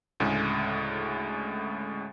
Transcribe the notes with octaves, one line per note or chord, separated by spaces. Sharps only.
D2 A2 C#3 G#3